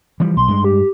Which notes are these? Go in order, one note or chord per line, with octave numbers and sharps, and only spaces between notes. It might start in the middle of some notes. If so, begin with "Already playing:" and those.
E3 F3 G3
B1 C6
G2 G#3
G4